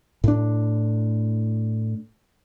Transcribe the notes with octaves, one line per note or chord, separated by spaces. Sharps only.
A2 D4